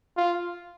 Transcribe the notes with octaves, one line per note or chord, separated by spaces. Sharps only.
F4